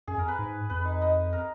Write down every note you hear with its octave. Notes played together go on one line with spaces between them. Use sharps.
F#2 G#4
F2 A#4
B4
G#2
F2 B4
D#4
D#4
A#4